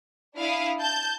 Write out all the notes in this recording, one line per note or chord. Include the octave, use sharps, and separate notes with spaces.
D4 E4 F5 D#6
A5 G6